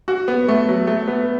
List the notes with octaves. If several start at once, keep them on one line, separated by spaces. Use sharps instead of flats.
F#4
B3
A3
F#3
A3
B3